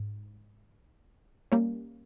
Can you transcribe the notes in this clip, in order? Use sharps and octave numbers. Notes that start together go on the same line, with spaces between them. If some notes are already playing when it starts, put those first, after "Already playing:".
Already playing: G#2
G3 A#3 C#4